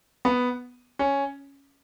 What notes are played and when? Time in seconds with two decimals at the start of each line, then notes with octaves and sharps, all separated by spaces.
0.25 B3
0.99 C#4